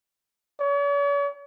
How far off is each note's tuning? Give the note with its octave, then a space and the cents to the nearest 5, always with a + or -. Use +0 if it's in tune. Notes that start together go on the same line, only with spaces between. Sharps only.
C#5 +45